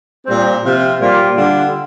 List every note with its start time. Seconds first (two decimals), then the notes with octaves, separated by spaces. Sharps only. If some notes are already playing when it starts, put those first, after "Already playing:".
0.26 A#2 G3 C4
0.63 C3 F3 C4 F4
0.99 A#2 G3 A#3 F4
1.35 D3 G3 D4 F4